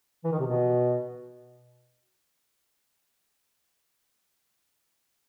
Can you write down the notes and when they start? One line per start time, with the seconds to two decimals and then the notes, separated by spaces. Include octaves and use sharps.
0.24 E3
0.32 D#3
0.39 C3
0.47 B2